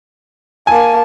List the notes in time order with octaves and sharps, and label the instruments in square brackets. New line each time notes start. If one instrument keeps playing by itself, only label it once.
[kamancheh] A#3 A5 [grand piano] G#5